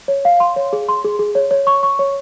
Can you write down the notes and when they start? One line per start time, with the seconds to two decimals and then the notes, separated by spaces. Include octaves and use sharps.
0.08 C#5
0.25 F5
0.40 C6
0.56 C#5
0.73 G#4
0.89 C6
1.04 G#4
1.19 G#4
1.35 C#5
1.51 C#5
1.67 C#6
1.83 C#6
1.99 C#5